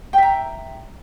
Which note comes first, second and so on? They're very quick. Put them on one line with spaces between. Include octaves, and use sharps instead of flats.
G5 E5 A#5